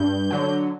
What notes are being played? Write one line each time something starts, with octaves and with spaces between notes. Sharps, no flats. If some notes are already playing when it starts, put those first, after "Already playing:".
Already playing: G2 G6
D3 F#3